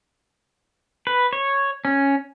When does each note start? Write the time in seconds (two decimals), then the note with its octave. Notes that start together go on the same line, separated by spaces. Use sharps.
1.07 B4
1.33 C#5
1.85 C#4